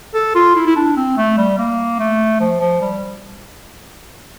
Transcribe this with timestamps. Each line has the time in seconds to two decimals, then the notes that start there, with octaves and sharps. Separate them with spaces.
0.14 A4
0.35 F4
0.56 E4
0.66 E4
0.76 D4
0.96 C4
1.17 A3
1.38 G3
1.58 A#3
1.99 A3
2.40 F3
2.61 F3
2.81 G3